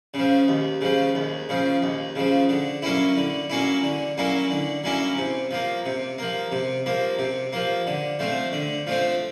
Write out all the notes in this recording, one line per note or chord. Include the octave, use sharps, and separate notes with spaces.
C#3
F3
D#2
C#3 F3
D#2
C#3 F3
D#2
C#3 F3
D3
F#3 A#3 C#4 E4
D3
F#3 A#3 C#4 E4
D3
F#3 A#3 C#4 E4
D3
F#3 A#3 C#4 E4
C3
F3 A#3
C3
F3 A#3
C3
F3 A#3
C3
F3 A#3
D3
F3 A3 C4
D3
F3 A3 C4